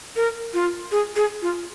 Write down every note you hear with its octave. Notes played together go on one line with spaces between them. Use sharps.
A#4
F4
G#4
G#4
F4